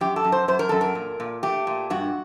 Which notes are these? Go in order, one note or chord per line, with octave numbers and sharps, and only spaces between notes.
F#2 G4
A4
F#2
C5
F#2 C5
A#4
F#2 A4
A#4
A#2
A#2
A3 G4
A#2
G2 F#4